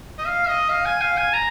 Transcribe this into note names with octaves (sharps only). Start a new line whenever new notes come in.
D#5
F5
D#5
F5
G#5
F5
G#5
A#5